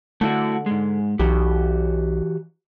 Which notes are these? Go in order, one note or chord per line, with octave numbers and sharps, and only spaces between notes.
D3 A3 E4 F#4
G#2 G#3
B1 E3 F#4 G4